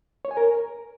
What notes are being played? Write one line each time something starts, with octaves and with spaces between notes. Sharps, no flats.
C#5
G#5
A#4